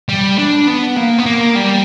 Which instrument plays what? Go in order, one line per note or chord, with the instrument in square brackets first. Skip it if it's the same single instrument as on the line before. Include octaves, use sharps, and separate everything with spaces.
[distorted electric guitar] G3
D4
B3
A#3
B3
A#3
G3